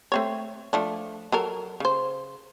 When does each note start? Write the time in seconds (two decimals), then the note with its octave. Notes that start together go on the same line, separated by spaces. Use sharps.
0.12 A3 C4 C#5
0.73 F3 A3 D4
1.32 F#3 A4 A#4
1.80 C#3 C5